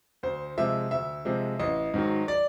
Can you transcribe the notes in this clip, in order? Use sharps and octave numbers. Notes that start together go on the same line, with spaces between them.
D2 C5
C3 F3 G#3 E5
D2 E5
C3 F3 G#3
A1 D#5
G#2 D#3 F#3
D5